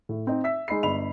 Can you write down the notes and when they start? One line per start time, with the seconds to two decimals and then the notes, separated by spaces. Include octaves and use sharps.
0.09 A2
0.27 C4 D#4
0.44 E5 E6 B6
0.68 G#3 D#4 B5 C7
0.83 G1 D#5 B5 F7